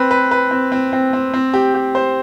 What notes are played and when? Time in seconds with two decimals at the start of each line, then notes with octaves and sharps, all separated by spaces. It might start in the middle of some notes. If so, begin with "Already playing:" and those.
Already playing: C4 B4
0.11 B4
0.31 B4
0.51 C4
0.72 C4
0.93 C4
1.13 C4
1.34 C4
1.54 G4
1.75 G4
1.95 C5